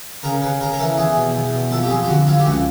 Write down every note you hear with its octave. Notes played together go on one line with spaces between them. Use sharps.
C#3 A#4
C#3 B4
C#3 A#4
A#4
E3 A4
E2 G#4
B2
E2
B2
F2 A4
G4
F2 G#4
G4
D3 F#4
F2 F4
G4
C#2 F#4